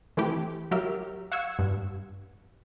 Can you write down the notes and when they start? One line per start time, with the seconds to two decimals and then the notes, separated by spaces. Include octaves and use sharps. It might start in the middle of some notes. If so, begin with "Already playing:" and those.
0.17 E3 A3 C4 E4 G4
0.71 F#3 G4 A#4 E5
1.32 F5 F#5 C#6 E6 G#6 C#7
1.59 G2